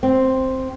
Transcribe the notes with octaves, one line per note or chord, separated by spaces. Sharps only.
C4